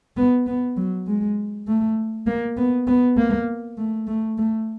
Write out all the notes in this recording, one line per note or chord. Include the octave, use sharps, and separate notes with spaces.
B3
B3
F#3
G#3
A3
A#3
B3
B3
A#3
A3
A3
A3